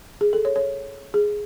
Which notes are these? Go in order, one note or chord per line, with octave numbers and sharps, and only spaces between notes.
G#4
A4
C#5
C#5
G#4